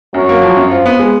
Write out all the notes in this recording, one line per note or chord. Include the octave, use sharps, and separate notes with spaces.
F#2 F#3
A#3
F3
F#2
F3 F4
B3
G#3